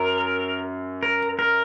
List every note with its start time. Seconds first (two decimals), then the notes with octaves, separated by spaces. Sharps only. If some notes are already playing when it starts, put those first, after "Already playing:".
Already playing: F#2 A#4
1.03 A#4
1.39 A#4